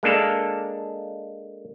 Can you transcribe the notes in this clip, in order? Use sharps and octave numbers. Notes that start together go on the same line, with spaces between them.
G#3 A#3 D4 A4 F5